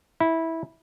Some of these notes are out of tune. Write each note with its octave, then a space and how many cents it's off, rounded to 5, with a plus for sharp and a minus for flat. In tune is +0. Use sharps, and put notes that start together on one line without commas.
E4 -15